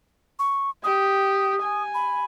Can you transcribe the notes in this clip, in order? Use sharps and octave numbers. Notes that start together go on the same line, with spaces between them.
C#6
G4 D#6
G#5
B5